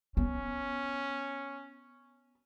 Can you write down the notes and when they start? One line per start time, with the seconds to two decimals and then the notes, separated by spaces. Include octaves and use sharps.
0.17 B3 C#4